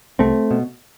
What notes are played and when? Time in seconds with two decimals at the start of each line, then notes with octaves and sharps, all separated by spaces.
0.19 C2 A3 C4
0.51 B2